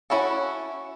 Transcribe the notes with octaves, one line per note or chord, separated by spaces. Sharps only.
C#4 E4 F#4 A4